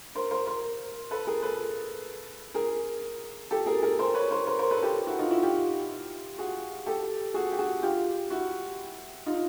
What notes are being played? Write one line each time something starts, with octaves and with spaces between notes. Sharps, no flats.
A#4 C5
A#4 C5
A#4 C5
A4 B4
G#4 A#4
A4 B4
G#4 A#4
G4 A4
G#4 A#4
G#4 A#4
A#4 C5
B4 C#5
A#4 C5
A#4 C5
A#4 C5
A4 B4
G4 A4
E4 F#4
D#4 F4
E4 F#4
F4 G4
F#4 G#4
G4 A4
F#4 G#4
G4
F#4 G#4
F4 G4
E4 F#4
D#4 F4